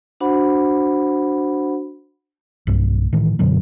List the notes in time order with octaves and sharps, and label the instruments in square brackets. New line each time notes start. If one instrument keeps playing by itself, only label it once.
[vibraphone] D4 F#4 C5 F#5 B5
[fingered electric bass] B1 G2
A2 D#3 E3
F#2 B2 D3 F#3